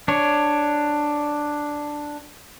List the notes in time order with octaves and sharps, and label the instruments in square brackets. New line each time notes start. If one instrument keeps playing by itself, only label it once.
[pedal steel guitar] D4 C#5